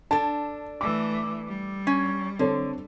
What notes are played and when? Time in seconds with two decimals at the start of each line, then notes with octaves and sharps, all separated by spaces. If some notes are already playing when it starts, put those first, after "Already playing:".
0.11 D4 A4 A5
0.81 E3 A3 D6 E6
1.48 G3
1.87 C#4
2.39 D3 C4 A4 C#5